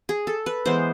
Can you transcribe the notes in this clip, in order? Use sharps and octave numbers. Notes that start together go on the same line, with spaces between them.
G#4
A4
B4
E3 G#3 B3 C5